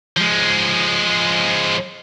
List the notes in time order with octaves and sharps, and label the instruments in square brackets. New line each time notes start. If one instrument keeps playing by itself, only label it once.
[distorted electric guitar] F3 G#3